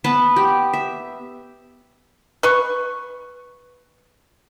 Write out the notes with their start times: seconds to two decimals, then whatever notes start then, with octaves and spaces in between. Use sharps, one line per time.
0.04 B3 B4 A5
0.36 G4
0.73 E5
2.43 B4 C#6